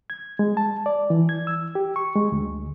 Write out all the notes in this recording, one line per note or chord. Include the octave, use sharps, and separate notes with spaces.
G#6
G#3
A5
D5
E3
G#6
E6
G4
C#6
G#3
D2